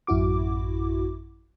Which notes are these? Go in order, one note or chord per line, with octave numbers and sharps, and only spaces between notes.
A1 F#2 E4 F#4 D6